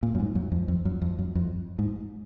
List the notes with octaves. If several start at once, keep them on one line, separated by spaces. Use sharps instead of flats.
A#2
F#2
G#2
F#2
F2
F2
F#2
F2
F#2
F2
G#2